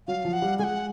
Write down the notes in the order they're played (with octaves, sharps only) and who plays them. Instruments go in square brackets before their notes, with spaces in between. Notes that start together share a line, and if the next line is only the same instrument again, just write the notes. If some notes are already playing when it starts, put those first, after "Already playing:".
[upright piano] F#3 [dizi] F5
[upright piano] F3
[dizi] F#5
[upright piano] G3
[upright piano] G#3 [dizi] F#5 G#5